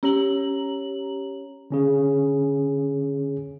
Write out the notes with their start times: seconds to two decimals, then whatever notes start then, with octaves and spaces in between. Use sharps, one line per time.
0.03 C#4 G4 C#5 A#5 F#7
1.70 D3 C#4 G#4